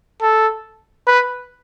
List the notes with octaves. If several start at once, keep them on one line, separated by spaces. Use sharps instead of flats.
A4
B4